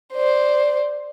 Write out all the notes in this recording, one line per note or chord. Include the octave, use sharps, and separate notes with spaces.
C5 D5